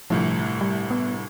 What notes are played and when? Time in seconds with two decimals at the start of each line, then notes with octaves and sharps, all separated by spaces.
0.10 G1 C2 A2 F3
0.61 G3
0.91 B3